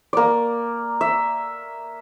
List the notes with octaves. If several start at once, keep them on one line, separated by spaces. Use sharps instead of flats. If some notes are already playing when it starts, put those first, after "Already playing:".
A#3 D5
E5